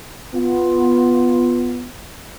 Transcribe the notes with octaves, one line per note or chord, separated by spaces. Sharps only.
B3 F4